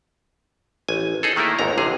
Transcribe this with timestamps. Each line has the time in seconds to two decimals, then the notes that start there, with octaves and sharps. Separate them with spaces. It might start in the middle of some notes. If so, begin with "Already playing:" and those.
0.88 A1 G#5
1.23 D#4 G#4 A4
1.36 D#3 A3 A#3 E4 A#4
1.59 G1 D#2 G#2 A#5
1.78 A1 C3 G#4